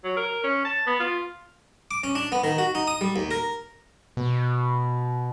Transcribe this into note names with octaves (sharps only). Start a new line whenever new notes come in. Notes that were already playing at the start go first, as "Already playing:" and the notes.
F#3
A#4
C#4
A5
B3
F4
D6
C#4
D4
B3
D#3
F#4
D#4
D#6
G3
D#2
A#4
B2